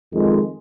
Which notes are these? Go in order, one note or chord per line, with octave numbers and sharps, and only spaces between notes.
F2 D#3 G#3